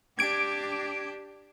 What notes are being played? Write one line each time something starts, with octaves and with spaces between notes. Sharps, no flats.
D4 G4 G#6 D7